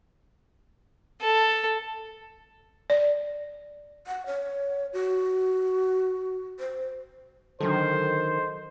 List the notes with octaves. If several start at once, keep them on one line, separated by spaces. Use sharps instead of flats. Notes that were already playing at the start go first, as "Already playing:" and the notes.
A4
D5
F#5
C#5
F#4
C5
D3 D#3 F#3 A4 C5